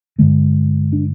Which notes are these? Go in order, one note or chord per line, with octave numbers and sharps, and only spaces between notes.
G2 D3 G#3
D4